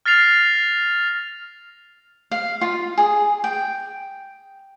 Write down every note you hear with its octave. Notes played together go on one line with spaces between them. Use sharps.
F6 A6 A#6 C7 F7
F5
F4
G#4
G5